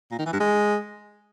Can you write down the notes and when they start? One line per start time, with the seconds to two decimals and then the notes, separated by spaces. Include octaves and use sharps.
0.11 A#2
0.18 D#3
0.26 E3
0.33 G2
0.40 G#3